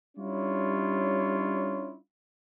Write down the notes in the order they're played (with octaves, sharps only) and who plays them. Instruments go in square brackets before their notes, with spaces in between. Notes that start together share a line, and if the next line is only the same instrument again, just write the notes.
[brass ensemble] G3 C#4 D4 E4 F4 C#5